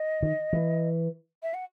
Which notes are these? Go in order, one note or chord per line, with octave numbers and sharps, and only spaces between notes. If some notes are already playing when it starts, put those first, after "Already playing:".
Already playing: D#5
D#3
E3
E5
F#5